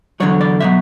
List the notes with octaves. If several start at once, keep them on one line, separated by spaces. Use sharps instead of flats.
E2 D3 F#3 C#5
D5
B2 F#3 E5